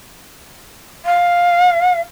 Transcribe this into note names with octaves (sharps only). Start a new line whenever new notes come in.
F5